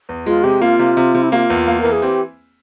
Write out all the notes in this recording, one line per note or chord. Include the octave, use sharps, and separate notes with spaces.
E2
G#3 F4
C3 G4
A#3 F4
C3
C3
C3
E4
A#3 F4 G4
E2
A#3
E3 A#4
G#4
C4 G4